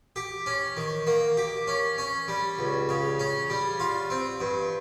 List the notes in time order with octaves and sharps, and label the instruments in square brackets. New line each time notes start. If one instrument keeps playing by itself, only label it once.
[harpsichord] G4
C#4
D#3
A#3
G4
C#4
C#4
G3
C#2
C#3
C#4
G3
F4
C4
G2